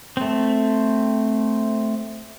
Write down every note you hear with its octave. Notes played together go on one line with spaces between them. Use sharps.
A3 C4